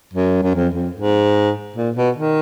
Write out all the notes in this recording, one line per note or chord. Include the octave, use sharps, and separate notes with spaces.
F#2
F#2
F2
F2
G#2
A#2
B2
D#3